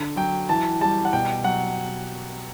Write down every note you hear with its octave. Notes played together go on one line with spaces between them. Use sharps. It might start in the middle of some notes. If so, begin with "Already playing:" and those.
Already playing: D3
F#3 G5
E3 A5
G3 A5
F#5
B2 G5
F#3 F#5